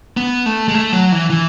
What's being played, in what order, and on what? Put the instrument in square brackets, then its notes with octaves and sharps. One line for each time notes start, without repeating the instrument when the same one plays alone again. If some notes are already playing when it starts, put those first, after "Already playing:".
[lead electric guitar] B3
A3
G#3
A3
F#3
E3
E3